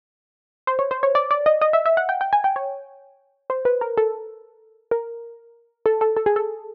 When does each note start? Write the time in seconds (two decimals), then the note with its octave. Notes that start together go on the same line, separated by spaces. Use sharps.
0.67 C5
0.79 C#5
0.91 C5
1.03 C#5
1.15 D5
1.31 D5
1.46 D#5
1.61 D#5
1.73 E5
1.86 E5
1.97 F#5
2.09 G5
2.21 G5
2.33 G#5
2.44 G5
2.56 C#5
3.50 C5
3.65 B4
3.81 A#4
3.97 A4
4.91 A#4
5.86 A4
6.01 A4
6.17 A4
6.26 G#4
6.36 A4